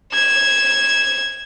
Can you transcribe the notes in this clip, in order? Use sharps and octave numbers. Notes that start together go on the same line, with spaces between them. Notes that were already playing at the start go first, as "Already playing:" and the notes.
G#6 E7